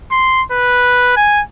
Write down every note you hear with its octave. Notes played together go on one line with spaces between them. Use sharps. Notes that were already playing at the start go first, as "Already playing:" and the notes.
C6
B4
G#5